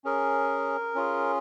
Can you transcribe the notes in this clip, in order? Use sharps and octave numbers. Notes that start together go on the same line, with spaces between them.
C#4 G#4 A#4
C#4 F4 G#4